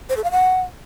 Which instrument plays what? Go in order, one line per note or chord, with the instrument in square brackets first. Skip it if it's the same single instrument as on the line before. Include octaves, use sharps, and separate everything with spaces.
[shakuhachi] C5
A4
F5
F#5